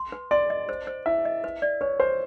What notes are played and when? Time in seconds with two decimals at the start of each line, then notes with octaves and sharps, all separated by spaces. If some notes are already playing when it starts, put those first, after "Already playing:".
Already playing: C6
0.12 B4
0.31 D5 C6
0.50 D#5
0.69 C5
0.87 C5
1.06 E4 E5
1.25 D#5
1.44 B4
1.62 D5
1.81 B4 C#5
2.00 B4 C5